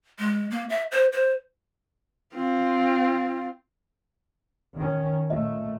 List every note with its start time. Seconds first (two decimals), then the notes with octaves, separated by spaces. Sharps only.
0.19 G#3
0.51 A#3
0.70 E5
0.91 C5
1.12 C5
2.35 C4 F4
4.75 D#3 C#4
5.30 A#2 A3 D#5